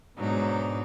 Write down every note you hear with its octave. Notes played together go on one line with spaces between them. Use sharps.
G#2 B2 F#3 D4 D#4